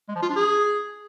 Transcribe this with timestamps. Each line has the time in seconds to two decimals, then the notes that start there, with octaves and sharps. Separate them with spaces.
0.09 G#3
0.16 F3
0.22 F4
0.29 D4
0.36 G#4